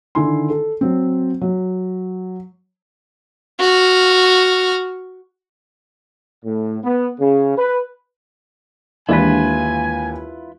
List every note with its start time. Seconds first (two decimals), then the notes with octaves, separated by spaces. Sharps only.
0.15 D3 D#3 E4 G#5 C6
0.50 A4
0.81 F#3 C4
1.41 F#3
3.59 F#4 F6
6.44 A2
6.84 B3
7.19 C#3
7.56 B4
9.09 D#2 E3 G#3 D4 E4 F4 B4 G#5